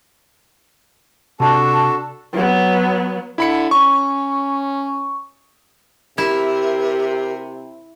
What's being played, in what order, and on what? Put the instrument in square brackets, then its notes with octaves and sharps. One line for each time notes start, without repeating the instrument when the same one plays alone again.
[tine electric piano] C3 [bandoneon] D4 F#4 A4 [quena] A5
[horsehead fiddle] F#3 B3
[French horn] D3 [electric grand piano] E4 B5 C#7
[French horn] C#4 [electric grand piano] C#6
[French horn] C3 [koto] E4 [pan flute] G4 [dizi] A#4